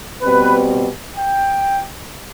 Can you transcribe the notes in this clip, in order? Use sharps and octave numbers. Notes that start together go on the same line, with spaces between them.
B2 G3 C4 B4
G5